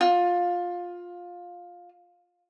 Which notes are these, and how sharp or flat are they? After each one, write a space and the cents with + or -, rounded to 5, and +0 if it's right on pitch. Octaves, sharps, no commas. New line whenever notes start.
F4 +15